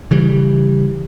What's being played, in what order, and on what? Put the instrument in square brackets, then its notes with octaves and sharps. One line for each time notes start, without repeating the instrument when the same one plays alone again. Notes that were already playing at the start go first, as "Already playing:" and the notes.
[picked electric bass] C#3 E3 G3